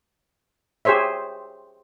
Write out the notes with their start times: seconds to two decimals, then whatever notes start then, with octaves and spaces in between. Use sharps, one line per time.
0.85 G4 G#4 C5 C#5 E5